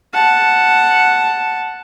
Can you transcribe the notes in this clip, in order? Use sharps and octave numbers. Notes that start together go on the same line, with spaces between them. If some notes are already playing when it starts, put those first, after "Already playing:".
F#5 A5